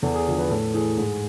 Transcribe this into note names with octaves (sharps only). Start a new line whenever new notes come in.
E2 A4
G#4
D3 F3
B4
A2 A4
E3 G#4
G#2